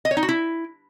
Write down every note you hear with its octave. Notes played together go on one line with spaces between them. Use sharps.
D#5
C#5
D#4
F#4
E4